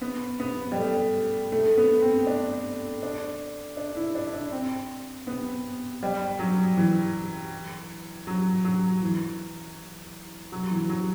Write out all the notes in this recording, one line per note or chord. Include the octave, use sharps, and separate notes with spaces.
B3
B3
G3
A3
A3
B3
C4
D4
D4
D4
E4
D4
D4
C4
B3
G3
F#3
E3
F#3
F#3
E3
F#3
E3
F#3